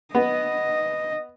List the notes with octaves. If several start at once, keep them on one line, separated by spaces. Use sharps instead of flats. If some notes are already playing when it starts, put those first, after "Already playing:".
B3 D#5